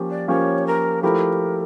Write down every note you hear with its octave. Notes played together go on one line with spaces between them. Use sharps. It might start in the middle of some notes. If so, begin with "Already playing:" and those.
Already playing: F3 A#3 C#4 G4
D5
F3 A#3 C#4 G4 C#5
A#4
F3 A3 E4 G4 A#4